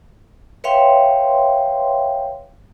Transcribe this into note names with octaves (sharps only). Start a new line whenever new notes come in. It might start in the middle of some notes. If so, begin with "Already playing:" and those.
B4 C#5 E5 F5 G5 C6